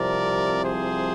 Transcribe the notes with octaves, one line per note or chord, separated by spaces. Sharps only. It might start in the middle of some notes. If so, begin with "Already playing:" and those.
Already playing: C2 C3 F3 A#4 D5
G#4 C5